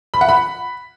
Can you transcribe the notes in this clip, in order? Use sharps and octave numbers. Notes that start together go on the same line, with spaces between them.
B5
F#5
B5